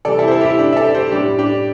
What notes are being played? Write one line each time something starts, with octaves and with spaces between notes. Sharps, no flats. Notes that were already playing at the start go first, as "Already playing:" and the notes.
C3 E3 G3 A4 D5
E4 A4
C5
E4 A4
G4
E4
D4
E5
A4 D5
G4 C5
A2 G3 D4 G4
D4 G4